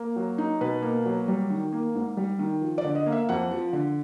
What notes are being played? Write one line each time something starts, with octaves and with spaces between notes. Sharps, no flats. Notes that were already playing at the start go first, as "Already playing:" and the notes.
Already playing: A#3
F#3
D#4
B2 B4
A#3
F#3
G3
D#3
A#3
G#2
G3
D#3
F3
D5
D3
D#5
A#3 F5
E5
F2 F#5
F3
D3